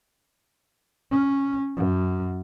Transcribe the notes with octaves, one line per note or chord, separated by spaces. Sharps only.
C#4
F#2